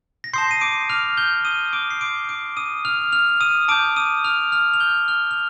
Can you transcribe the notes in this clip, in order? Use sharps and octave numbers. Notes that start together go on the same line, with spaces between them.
A#6
A5 C6 D#6 G6 C7
D#7
D6 D7
F6 F7
G6 G7
D#6 D#7
D6 D7
C7
C6 D6 G6 D7
D6 D7
D#6 D#7
F6 F7
F6 F7
D#6 D#7
A5 D6 D#6 G6 D7
D#6 D#7
F6 F7
F6 F7
F7
G6 G7
F6 F7
F7